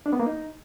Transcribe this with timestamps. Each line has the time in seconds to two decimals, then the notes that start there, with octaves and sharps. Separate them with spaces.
0.06 D4
0.13 B3
0.20 A#3
0.26 D#4